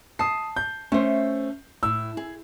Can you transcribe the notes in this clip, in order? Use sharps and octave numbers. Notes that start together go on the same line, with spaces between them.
A5 D#6 C7
G6
A3 C#4 C5
A2 E6
G#4